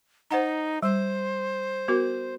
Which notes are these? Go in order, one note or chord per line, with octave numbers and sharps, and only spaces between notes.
D#4 C5 F#5 A#5
G3 C5
B3 F#4 A#4